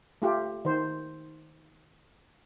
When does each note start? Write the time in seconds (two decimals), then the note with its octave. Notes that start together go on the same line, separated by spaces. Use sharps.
0.22 A3 F4 G4
0.65 D#3 C5